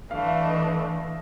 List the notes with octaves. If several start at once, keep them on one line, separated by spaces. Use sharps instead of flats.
E3 A3 D4 F5
E5
D#5